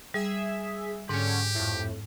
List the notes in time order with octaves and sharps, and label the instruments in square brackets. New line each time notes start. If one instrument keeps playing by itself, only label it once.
[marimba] G3 [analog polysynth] G#4 E5
[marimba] G#2 [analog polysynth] D3 C#4 [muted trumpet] G4
[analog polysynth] F2 A2